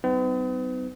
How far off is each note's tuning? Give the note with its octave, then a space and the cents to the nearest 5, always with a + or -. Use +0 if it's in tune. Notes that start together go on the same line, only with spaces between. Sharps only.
F#3 +45 B3 +45 D#4 +0